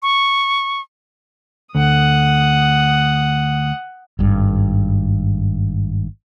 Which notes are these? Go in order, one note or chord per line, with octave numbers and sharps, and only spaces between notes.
C#6
D2 F#5 D#6
G#1 G2